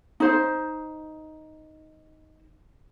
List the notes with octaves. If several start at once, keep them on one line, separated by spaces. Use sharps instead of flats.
D#4 C5